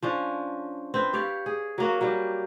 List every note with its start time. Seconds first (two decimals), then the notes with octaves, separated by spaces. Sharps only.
0.02 F3 C#4 D4
0.94 C4 B4
1.13 G4 C#5 D5 F5
1.46 G#4
1.78 F#3 A#3 F#4
2.01 F#3 G3 G4